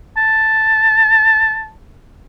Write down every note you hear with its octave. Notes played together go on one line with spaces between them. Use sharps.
A5